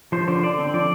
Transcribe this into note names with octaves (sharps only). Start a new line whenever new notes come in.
F3 C5
D3 C5
D3 D5
C4
F3 D5